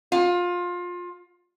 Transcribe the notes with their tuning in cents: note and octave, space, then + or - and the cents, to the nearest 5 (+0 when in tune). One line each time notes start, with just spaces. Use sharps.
F4 +20